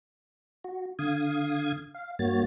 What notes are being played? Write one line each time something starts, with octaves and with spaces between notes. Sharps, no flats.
F#4
D3 F5 D#6 G#6
F5
G2 A#3 F#4 C#5 A6